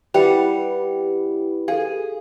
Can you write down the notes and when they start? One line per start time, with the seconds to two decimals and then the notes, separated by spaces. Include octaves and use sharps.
0.14 G3 E4 G4 B4 F#5 C#7 F7
1.68 G#4 A4 F5